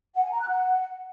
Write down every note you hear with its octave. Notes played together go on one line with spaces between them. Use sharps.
F#5
G#5
A#5
F#6
F#5